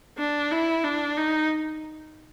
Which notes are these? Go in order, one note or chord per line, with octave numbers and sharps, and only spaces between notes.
D4
E4
D4
D#4